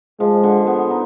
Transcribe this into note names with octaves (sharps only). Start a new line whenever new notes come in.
F3 G#3
D3
B3
D#4